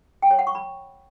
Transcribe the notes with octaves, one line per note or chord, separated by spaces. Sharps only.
G5
C#5
F#5
C#6
B5